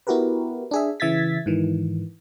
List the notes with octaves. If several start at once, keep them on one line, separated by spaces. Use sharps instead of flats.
B3 E4 F#4 G4 A#4 B4
D4 G#4 E5
C#3 E3 E5 G#6 A6 B6
G#2 D#3 E3